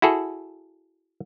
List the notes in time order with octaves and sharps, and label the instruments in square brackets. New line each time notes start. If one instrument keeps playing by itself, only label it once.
[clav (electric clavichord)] E4 F#4 G#4 A4